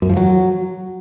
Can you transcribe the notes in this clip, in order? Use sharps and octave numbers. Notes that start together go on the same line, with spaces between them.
F#2
F3
F#3